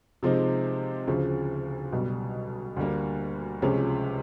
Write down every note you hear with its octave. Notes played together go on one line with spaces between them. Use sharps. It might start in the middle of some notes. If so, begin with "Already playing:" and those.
C3 F3 G#3 C4 D#4
D2 C#3 F3
B1 B2 G3
D2 D3 G3 A#3
C#2 C3 F3 G#3 C#4